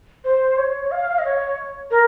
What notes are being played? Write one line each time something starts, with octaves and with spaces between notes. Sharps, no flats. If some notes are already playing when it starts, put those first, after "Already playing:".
C5
C#5
F5
D#5
C#5
A#4